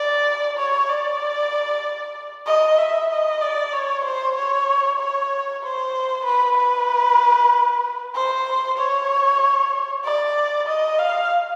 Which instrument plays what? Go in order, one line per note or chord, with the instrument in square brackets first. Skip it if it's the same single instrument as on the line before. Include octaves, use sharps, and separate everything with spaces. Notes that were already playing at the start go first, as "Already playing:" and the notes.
Already playing: [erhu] D5
C#5
D5
D#5
E5
D#5
D5
C#5
C5
C#5
C#5
C5
B4
B4
C5
C#5
D5
D#5
F5